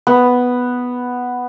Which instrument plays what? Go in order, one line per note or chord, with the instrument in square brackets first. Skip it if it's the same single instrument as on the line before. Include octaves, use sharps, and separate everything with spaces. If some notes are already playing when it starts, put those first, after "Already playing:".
[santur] B3